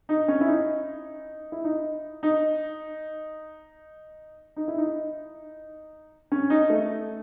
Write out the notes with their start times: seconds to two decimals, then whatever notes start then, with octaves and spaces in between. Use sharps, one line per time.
0.09 D#4
0.28 C#4
0.41 E4
0.48 D#4
1.52 E4
1.64 D#4
2.23 D#4
4.56 D#4
4.68 E4
4.78 D#4
6.32 C#4
6.50 D#4
6.70 A3